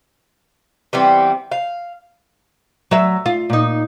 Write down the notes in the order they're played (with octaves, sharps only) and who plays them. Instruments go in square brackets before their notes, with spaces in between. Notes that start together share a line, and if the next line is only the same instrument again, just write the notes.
[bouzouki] E3 G3 B3 C4
F5
[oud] F#3 E5
F4
A#2 D#4